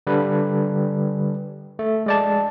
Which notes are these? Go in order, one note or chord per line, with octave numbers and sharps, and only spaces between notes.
D3 G3 B4
A3
G#3 D5 A5